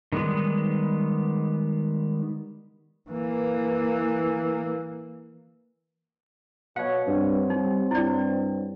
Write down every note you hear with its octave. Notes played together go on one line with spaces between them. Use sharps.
D#3 G3 G#3 B3
E3 A#3
B2 C#5 F5 F#5
G2 C4
G3 D#4
G2 E4 D5